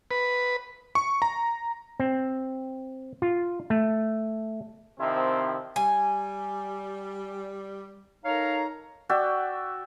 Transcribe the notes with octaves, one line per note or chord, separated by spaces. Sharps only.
B4
C#6
A#5
C4
F4
A3
C3 D#3 F3 C4 E4
G3 G#5
D#4 A4 A#4 C#5 F5 A#5
F#4 D5 E5 G5